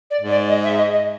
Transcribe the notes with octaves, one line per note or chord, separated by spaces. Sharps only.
D5
G#2
D5
D#5
E5
D#5
D#5